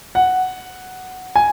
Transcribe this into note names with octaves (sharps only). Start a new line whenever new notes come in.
F#5
G#5